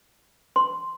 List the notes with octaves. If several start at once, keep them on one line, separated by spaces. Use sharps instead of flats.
C6